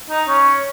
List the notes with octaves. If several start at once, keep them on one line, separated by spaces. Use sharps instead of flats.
D#4
C#4